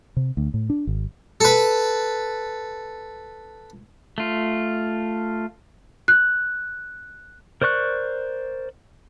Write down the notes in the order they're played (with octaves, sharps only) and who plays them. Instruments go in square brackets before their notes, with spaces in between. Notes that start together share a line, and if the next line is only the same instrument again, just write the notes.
[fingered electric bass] C3
D2
A2
D4
G#1
[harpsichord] A4 B4
[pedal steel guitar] A3 F4
[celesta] F#6
[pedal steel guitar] A#4 C5 D5 C#6 F#6